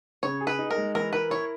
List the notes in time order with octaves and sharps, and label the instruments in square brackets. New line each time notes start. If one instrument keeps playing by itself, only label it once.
[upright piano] C#3 [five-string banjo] C#5
[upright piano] G#4
[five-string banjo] B4
[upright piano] D#4
[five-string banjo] A#4
[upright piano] G#3
[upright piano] E3 [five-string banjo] A#4
[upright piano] A#4 [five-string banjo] B4
[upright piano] E4 [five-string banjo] C#5